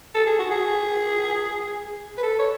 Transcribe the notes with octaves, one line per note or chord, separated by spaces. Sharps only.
A4
G#4
F#4
G#4
B4
A4
C#5